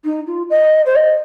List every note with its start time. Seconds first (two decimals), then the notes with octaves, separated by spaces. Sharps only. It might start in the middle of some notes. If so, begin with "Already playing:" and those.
0.04 D#4
0.27 F4
0.50 D#5
0.86 C5
0.96 D#5